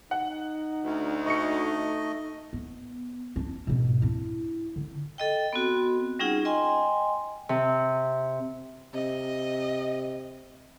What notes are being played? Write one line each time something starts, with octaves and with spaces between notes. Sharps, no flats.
D#4 F#5
D2
A3 D#5 C#6 C#7
B3
C#4 D4
G#2 B2
D4 E4
D3
A4 D#5 G5
B3 C4 F#4
G3 C#4 D#4 F4 G#4 F#5
D#5 G5 G#5 C6
C3
C3 D#5